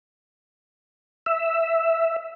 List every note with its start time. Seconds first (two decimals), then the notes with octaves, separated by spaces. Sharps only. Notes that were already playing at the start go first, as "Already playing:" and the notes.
1.26 E5